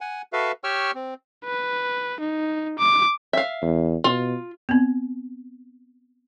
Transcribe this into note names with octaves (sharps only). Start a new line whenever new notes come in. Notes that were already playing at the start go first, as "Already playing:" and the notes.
F#5 G#5
F#4 A4 B4 E5 F5
G4 C#5 G5 C#6 E6 F6
C4
B4
D#4
D6
E5 F5
E2
B2 F4
B3 C4